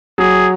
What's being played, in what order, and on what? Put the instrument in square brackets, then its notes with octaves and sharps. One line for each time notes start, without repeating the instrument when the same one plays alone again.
[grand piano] F#3 [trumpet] G#4